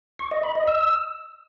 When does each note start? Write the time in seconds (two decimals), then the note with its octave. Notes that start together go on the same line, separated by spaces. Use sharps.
0.19 C#6
0.31 D#5
0.43 B5
0.55 D#5
0.67 E6